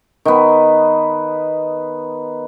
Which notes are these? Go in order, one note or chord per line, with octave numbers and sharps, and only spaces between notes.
D#3 B3